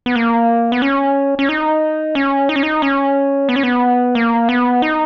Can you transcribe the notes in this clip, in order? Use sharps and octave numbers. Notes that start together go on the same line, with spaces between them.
B3
A#3
B3
C#4
C#4
D#4
C#4
D#4
C#4
D#4
C#4
B3
C#4
B3
A#3
B3
D#4